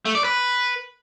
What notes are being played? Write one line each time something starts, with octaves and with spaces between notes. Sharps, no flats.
A3
D5
B4